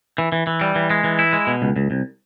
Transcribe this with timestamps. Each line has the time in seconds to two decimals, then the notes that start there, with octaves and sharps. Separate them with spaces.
0.18 E3
0.32 E3
0.47 E3
0.61 G3
0.75 E3
0.90 G#3
1.04 E3
1.19 E4
1.33 G#3
1.47 B2
1.62 C#2
1.76 C#2
1.91 C2